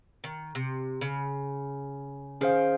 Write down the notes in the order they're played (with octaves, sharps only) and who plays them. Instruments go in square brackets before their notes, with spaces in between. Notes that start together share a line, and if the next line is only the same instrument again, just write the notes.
[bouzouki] D#3
C3
C#3
[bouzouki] D#3 [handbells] C#4 G#4 C5 F5